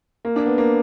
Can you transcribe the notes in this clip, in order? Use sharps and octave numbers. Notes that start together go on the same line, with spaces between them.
A#3
D4
B3
A#3